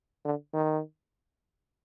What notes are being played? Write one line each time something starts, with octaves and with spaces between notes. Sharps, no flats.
D3
D#3